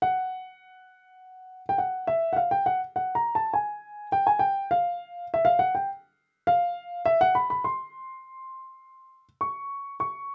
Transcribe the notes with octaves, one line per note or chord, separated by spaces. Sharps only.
F#5
G5
F#5
E5
F#5
F5
G5
F#5
F#5
A#5
A5
G#5
G5
G#5
G5
F5
E5
F5
F#5
G5
F5
E5
F#5
B5
B5
C6
C#6
C#6